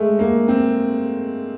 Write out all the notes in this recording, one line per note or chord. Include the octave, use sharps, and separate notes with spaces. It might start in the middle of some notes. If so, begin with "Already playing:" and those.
Already playing: G#3 A3
A#3
C4